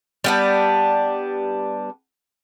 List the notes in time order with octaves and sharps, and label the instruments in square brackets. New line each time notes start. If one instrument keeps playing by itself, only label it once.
[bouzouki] G3 B3 D4